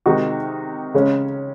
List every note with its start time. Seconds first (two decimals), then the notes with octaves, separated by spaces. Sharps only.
0.06 C3 D#3 G#3 D#4 F#4
0.94 C#3 G#3 C#4